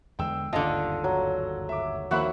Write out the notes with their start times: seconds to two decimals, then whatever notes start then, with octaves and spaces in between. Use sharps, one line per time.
0.19 E2 D3 G#3 G5 E6
0.53 G1 D#2 G#2 D3 F4 A4 D#5 A5
1.04 F#3
1.69 E5 D6
2.11 D#2 F3 A#3 E4 F#4 E5 F#5 B5